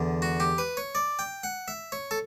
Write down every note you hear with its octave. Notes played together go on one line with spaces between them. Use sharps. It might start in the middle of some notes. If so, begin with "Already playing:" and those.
Already playing: E2 D3
F#4
G4
B4
C#5
D5
G5
F#5
E5
C#5
A4